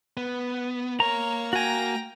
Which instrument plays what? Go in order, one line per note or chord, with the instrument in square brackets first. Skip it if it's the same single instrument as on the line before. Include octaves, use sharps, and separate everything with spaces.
[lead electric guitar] B3
[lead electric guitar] A#3 A#4 [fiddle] C#5 [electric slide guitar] A#5
[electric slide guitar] F#4 G#5 [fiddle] G5 A#5